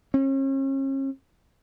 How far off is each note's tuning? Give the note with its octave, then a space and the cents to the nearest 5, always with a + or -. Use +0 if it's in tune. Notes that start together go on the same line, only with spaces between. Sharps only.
C#4 -40